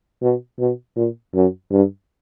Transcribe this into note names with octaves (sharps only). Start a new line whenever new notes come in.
B2
B2
A#2
F#2
G2